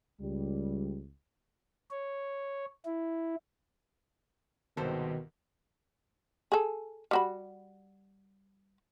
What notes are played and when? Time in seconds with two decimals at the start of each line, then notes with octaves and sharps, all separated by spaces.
0.21 C#2 G3
1.91 C#5
2.85 E4
4.77 C2 G#2 B2 D#3 A4 C5
6.52 G#4 A4
7.11 G3 F#4 B5